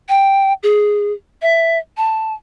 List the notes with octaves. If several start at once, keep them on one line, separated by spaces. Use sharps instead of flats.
G5
G#4
E5
A5